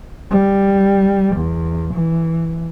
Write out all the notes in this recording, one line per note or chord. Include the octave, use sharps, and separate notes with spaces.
G3
E2
E3